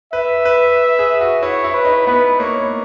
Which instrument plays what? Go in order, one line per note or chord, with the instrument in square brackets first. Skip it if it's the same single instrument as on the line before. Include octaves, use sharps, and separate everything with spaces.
[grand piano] B4 [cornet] E5
[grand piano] B4
G#4
F#4
[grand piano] E4 [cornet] C#5
[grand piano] E4
[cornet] B4
[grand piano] D#4
[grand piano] B3 [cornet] B4
[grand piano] A#3 [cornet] C#5